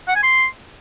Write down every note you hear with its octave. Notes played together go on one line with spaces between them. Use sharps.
F#5
G#5
C6